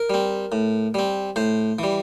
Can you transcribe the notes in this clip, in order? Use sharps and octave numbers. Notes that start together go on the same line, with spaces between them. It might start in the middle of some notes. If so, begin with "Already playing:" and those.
Already playing: A#4
G3 C4
A2
G3 C4
A2 C5
E3 G3